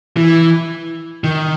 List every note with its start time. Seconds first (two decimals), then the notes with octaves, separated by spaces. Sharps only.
0.17 E3
1.24 D#3